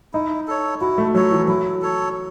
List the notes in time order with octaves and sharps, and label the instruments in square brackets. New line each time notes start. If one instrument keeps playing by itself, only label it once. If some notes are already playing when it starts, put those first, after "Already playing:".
[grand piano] D#4 [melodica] E4
[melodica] A4 C#5
[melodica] E4 [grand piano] F#4
[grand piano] A3
[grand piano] F#3 [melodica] A4 C#5
[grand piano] E3
[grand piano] F#3 [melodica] E4
[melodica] A4 C#5